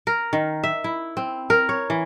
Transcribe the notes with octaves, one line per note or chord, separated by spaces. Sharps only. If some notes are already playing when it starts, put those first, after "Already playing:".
A#4
D#3
E5
E4
C4
A#4
C#5
E3